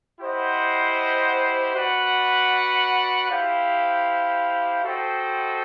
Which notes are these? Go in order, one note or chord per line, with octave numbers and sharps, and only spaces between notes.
E4 G4 C5 D#5 F#5
F#4 B4 D5 F#5
E4 G4 C5 F5
F#4 A4 C5 D#5 G5